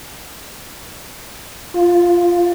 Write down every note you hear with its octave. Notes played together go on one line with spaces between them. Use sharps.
F4